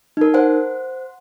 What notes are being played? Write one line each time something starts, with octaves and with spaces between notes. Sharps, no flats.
D#4 A#4
C5 F#5